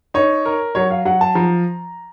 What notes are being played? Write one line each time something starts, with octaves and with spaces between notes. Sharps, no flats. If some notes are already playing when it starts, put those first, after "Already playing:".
D#4 C#5
A#4
F#3 C#5
F5
F#3 F#5
A5
F3 A#5